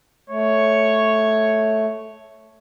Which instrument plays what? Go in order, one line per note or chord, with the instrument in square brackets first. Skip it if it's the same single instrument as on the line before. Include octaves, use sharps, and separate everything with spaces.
[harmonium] A3 [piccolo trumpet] C#5